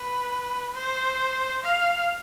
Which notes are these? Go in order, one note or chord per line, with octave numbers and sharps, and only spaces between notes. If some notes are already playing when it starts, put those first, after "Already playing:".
Already playing: B4
C5
F5